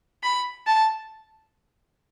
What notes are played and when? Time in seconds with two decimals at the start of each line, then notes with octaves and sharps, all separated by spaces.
0.23 B5
0.67 A5